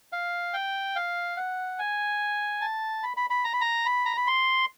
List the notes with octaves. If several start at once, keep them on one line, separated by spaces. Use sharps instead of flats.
F5
G5
F5
F#5
G#5
A5
B5
B5
B5
A#5
B5
A#5
B5
A#5
B5
C6